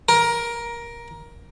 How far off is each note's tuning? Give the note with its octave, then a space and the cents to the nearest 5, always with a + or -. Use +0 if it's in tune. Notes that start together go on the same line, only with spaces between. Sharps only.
A#4 +15